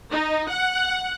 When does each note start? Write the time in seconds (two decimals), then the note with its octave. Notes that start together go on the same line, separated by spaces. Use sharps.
0.11 D#4
0.50 F#5